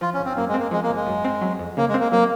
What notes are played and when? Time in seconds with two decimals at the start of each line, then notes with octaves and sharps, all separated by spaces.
0.01 F3 F4
0.14 C#4
0.20 G#1
0.25 C4
0.37 F#2 A#3
0.49 G#3
0.54 C4
0.60 A#3
0.71 F3 G#3
0.83 A#3
0.89 G#1
0.95 G#3
1.06 F#2
1.24 C4
1.41 F#3
1.59 F2
1.77 C#3 A#3
1.88 G#3
1.94 C4
2.00 A#3
2.12 F#3 A#3